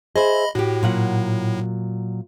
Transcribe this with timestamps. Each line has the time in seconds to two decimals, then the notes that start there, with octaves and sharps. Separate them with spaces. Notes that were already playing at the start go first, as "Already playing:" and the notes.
0.16 G#4 C5 D#5 E5 B5
0.55 A2 F#4 G4
0.83 A#2 F#3 F#5